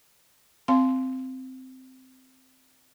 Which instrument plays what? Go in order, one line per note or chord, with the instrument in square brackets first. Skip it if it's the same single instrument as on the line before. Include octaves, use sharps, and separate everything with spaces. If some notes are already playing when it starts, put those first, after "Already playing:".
[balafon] C4 F5 C6